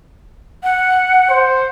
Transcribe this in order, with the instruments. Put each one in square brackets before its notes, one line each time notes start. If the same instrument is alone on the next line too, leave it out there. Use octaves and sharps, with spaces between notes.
[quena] F#5
[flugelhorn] C5